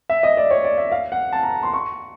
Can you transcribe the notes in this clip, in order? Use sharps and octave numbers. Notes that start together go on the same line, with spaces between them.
E5
D#5
D5
C#5
D5
E5
F5
F#5
A5
A#5
C6
C#6